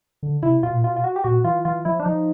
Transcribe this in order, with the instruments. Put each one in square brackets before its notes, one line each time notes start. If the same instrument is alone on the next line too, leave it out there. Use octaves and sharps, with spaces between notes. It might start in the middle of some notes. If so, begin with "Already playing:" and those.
[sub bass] D3
[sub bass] C3 [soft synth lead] E4
[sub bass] B2 [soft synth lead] F4
[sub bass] A#2
[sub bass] B2 [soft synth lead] F4
[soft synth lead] F4
F#4
G4
[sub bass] A#2 [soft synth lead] F#4
[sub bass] E3 [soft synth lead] F4
[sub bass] E3 [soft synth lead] F4
[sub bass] F3 [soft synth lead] E4
[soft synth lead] D4
[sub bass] F3 [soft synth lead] D#4